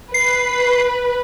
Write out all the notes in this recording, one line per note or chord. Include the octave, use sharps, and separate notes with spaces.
B4 C7